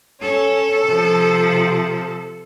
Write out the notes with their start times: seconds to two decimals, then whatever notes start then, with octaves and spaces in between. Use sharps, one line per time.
0.22 C#4 A4
0.86 C3 F3